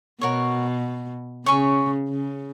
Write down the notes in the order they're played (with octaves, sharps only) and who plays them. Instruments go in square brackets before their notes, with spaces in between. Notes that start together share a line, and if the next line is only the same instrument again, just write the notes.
[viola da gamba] B2 [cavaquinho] F#4 A#4 C#5
[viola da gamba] C#3 [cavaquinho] C#5 G#5 C#6
[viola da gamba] C#3